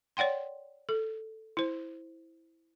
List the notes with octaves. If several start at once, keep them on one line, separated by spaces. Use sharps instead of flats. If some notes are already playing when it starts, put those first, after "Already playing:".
C#5 D5 F#5 G5 C6
A4
E4 C5